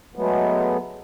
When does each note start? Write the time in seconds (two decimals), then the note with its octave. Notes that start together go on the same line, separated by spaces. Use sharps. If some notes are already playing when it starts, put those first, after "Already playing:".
0.15 F#3 G#3 A3 B3